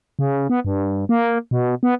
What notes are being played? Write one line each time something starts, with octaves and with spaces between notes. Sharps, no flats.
C#3
B3
G2
A#3
B2
B3